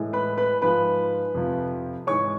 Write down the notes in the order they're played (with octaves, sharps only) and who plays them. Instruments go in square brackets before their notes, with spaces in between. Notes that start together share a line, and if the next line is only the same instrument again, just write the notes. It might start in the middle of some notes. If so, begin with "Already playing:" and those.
Already playing: [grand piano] A2 E3 G#3
B4 B5
B4 B5
G#2 F3 G#3 B4 B5
F2 C3 F3
G#2 E3 G#3 C#5 C#6